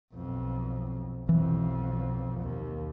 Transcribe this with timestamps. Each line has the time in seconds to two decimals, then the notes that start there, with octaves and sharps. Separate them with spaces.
0.14 B1 F2
1.29 B1 F2 E3
2.40 D#2